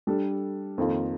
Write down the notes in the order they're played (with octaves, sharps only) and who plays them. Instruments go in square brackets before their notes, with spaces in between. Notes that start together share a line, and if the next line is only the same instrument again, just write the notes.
[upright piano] G3 D4 A4
F2 D#3 A#3 F4 A4